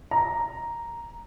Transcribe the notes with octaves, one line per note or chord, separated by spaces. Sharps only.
A#5